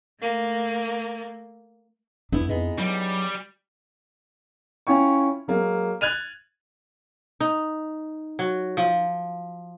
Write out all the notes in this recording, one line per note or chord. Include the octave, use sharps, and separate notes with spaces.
A3 A#3
F2 B3 D4 E4
F2 G#3 B3 D#4
F#3 G3
C#4 E4 F4 G5 G#5 C#6
F#3 G#3 A#3
F#6 G#6 A6 D#7 F7
D#4
F#3
F3